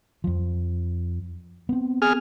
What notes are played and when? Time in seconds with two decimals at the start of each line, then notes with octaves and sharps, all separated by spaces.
0.24 F2 F3
1.69 B3 C4
2.02 G#4 F6